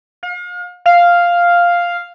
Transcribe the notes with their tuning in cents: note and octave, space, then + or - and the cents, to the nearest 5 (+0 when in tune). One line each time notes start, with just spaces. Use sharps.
F5 +40
F5 +0